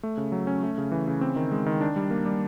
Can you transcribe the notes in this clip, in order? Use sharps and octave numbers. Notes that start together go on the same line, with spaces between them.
A3
C#3
F#3
C#4
A3
C#3
E3
C#3
C4
D#3
G#3
D#3
D4
G3
A#3
G3